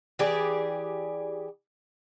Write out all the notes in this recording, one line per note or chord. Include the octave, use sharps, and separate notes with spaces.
E3 G4 G#4 D5